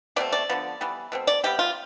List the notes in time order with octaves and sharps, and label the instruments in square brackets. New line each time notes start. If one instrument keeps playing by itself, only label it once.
[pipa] B2 A3 C4 D5
D5
D3 F3 B3
E3 G3 B3
B2 A3 C4
D5
C3 G3 B3 G4
F4